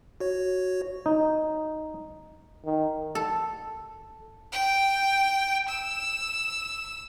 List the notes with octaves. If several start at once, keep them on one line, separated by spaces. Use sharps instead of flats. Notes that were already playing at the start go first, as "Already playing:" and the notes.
F#4 C#5
D#4
D#3
A4
G5
E6